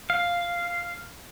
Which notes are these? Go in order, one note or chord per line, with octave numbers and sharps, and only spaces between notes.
F5